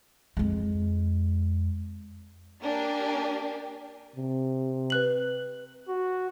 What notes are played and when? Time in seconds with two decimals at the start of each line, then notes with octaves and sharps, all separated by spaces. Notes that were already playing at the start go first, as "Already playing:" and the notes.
0.37 F2 G#3
2.62 A#3 D4 G4 G#5
4.16 C3
4.90 B4 F#6 F#7
5.89 F#4